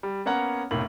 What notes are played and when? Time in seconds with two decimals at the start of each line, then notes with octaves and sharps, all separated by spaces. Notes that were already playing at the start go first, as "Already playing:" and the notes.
0.03 G3
0.25 A#3 B3 C#4 C#5 F#5 A#5
0.71 F1 B1 A2 A#3 F#7